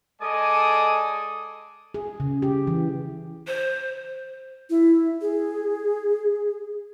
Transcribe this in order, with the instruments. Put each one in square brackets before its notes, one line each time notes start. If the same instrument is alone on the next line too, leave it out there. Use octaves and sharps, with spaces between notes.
[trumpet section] G#3 A4 D5 D#5 G#5 D#6
[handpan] G#4
C#3
G4
E3
[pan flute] C5
[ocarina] E4
G#4